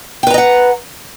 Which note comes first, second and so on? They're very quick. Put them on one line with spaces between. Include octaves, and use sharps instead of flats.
G5 B4 A#5 D#5 F#5